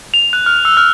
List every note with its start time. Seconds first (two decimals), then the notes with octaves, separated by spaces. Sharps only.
0.14 F7
0.33 F#6
0.46 F6
0.65 E6
0.77 F6